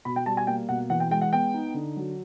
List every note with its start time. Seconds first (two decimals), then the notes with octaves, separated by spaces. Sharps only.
0.05 B2 B5
0.16 G5
0.26 G3 A5
0.37 G#5
0.47 A#3 G5
0.69 B2 F#5
0.90 E3 F#5
1.00 G5
1.11 G#3 G5
1.21 F#5
1.33 B3 G5
1.54 D#4
1.74 D3
1.96 F#3